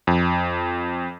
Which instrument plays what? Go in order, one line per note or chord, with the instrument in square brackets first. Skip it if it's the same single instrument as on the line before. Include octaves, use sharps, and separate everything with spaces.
[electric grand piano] F2